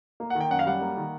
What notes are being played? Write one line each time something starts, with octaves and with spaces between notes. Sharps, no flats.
A#3
F#5
D#3
G5
F#2 F#5
F5
G3 F#5
A#3
D#3